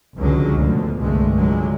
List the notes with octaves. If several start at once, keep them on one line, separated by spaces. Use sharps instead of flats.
F1 C#2 D3 F#3 G#3 C#4
A1 D2 B2 D3 F3
C2 G2 D3 G#3 A3
C#2 D3 F#3 G#3